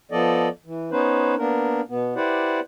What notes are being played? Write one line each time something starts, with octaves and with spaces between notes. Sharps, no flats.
F3 B3 A4 D5 D#5
E3
B3 C#4 D#4 B4 C5
A#3 B3 D4 A#4
B2 B3
E4 G4 B4 C5 D5 F#5